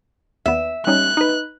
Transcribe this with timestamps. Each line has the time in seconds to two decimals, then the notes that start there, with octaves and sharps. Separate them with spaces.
0.46 D#2 B3 E5
0.87 G3 C#4 D#4 F#6
1.17 D#4 B4